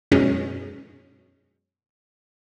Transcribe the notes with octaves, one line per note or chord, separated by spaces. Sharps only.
F#2 B2 G#3 C#4